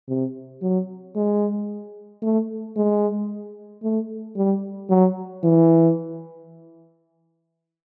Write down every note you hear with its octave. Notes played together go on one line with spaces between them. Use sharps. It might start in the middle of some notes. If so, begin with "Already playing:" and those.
C3
F#3
G#3
A3
G#3
A3
G3
F#3
E3